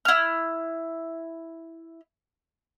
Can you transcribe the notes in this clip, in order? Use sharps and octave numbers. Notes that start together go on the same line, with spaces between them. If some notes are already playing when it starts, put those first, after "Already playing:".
E4 F6